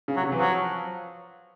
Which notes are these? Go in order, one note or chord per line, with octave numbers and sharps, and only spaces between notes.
C#3
F#3
C3
E3
F3 F#3